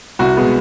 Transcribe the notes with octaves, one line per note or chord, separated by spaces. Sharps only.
C2 F#4
B2 G#3 B3